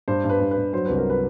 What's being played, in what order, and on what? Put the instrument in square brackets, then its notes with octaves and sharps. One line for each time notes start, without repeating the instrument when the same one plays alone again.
[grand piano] G2 C5
G2
B4
G2
B4
G2
F#3 C5
C2 B4
A#4
B4